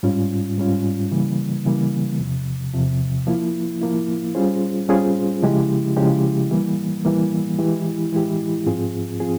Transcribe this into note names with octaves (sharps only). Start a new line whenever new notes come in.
G#2 G3 C#4 F4
G#2 G3 C#4 F4
C#3 E3 G3 A#3
C#3 E3 G3 A#3
E2 C3 F3
E2 C3 F3
F3 A#3 E4
F3 A#3 E4
G3 C#4 F4 G#4 C5
G3 C#4 F4 G#4 C5
C#3 F3 G#3 E4 G4
C#3 F3 G#3 E4 G4
E3 G3 A#3
E3 G3 A#3
E3 G#3 E4 G4
E3 G#3 E4 G4
G#2 F3 C4 F4 G#4
F3 C4 F4 G#4